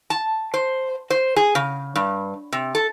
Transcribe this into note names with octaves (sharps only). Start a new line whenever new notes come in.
A5
C5
C5
G#4
C#3
G2
C3
A4